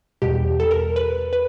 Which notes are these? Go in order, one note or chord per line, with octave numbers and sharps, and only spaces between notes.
E2 B2 G3 G4
A4
A#4
B4
B4